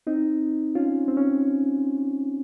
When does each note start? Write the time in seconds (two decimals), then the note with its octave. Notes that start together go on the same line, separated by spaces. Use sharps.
0.07 C4 D#4
0.75 C#4 F4
1.08 C4
1.17 C#4